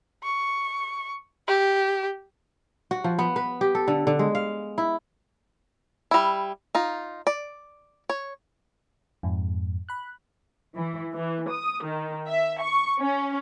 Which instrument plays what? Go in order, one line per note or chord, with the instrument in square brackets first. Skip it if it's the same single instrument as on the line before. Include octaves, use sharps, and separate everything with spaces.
[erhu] C#6
G4
[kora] F#4
F3
B3
B4
G4
A4
D3
D3
G#3
F5
E4
[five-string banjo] G3 E4
D#4 F4
D5
C#5
[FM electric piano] F2 G#2
B5 F#6
[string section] E3
E3
D#6
D#3
E5
C#6
C#4